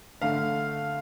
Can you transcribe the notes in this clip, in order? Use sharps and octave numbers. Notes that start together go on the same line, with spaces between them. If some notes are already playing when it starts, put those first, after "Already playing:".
D3 A3 F5